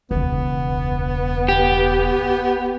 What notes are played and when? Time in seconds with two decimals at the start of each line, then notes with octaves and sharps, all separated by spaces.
0.11 E1 C#2 B3
1.49 G4